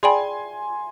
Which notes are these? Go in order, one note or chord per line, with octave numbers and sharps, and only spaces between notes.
G#4 D5 G5 G#5 B5 C6